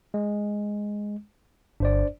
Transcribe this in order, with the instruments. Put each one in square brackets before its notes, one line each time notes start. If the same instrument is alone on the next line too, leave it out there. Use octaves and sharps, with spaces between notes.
[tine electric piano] G#3
[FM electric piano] G1 [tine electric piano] D4 C5 D5